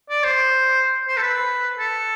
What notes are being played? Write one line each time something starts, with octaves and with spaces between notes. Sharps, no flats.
D5
C5
C5
A4
B4
A4